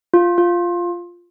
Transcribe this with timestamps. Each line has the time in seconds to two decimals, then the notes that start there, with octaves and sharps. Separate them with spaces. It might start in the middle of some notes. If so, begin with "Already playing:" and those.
0.14 F4
0.38 F4